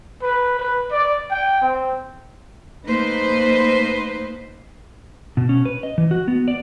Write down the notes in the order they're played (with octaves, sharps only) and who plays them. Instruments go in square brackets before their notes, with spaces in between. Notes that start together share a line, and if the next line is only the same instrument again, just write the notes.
[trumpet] B4
B4
D5
G5
C4
[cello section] A3 A#3 D#4 B4 C5
[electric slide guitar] B2
C#4
B4
D#5
E3
F#4
B3
D5